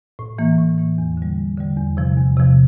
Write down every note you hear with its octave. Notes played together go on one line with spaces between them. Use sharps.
A2
E3 A#3
A2
E3 A#3
E2
D3 G3
E2
D3 G3
E2
C3 F3
E2
C3 F3